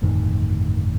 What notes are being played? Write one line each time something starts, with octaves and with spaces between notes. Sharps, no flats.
G1 F2 A2 D#3